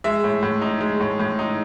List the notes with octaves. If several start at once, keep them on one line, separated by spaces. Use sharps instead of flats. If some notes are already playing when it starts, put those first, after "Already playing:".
G#3 E5
A2
A2
D#4
G#3
A2
A2
D#4